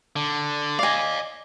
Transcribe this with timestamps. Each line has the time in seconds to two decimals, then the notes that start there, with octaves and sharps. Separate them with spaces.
0.16 D3
0.79 D5 D#5 F5 G#5